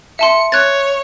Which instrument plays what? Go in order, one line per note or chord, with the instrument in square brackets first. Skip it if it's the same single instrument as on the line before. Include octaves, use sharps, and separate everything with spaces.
[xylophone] E5 A5 C6 [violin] C#7
[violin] C#5 [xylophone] F#6 G#6 A6